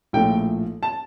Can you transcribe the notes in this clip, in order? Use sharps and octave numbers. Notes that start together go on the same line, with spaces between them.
A#1 A2 F3 A3 G5
A5